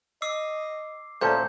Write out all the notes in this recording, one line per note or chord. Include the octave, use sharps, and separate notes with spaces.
D#5 D6 E6 C7
D2 A#2 C#4 A4 C5 A5 G6